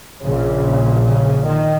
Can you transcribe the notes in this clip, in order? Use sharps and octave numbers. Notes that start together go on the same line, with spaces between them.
A#1 A#2 C#3
C#3
D#3